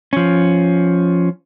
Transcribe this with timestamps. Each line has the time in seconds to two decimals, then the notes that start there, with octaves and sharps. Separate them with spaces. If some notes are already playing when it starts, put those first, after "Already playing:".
0.13 F3 C#4